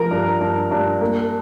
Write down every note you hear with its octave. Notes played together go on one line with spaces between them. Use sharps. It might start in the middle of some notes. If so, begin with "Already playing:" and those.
Already playing: F3 A#4 A#5
G2
G2
G2
A#3